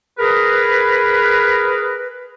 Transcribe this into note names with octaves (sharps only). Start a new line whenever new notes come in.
G#4 A#4 B4